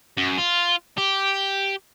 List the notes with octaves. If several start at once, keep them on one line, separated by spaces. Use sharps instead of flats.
F#2
F4
G4